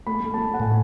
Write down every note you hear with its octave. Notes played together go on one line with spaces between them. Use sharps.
A3 B5
A3
A5
A3
F#5
A2 G#5